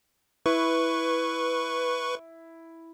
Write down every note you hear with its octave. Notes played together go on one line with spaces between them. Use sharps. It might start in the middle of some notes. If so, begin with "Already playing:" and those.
E4 B4 C#6